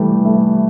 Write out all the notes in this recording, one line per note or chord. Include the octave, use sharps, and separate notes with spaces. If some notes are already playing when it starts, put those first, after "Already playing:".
Already playing: E3 G3 A3
A3